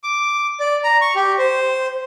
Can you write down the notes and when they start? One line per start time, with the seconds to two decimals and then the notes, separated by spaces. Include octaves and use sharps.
0.04 D6
0.60 D5
0.84 A#5
1.01 C#6
1.15 G4
1.38 C5